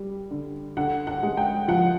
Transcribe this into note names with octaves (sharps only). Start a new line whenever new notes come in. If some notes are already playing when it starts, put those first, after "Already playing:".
Already playing: G3
D3
D3 F#5
F#5
G#3
G5
F3 F#5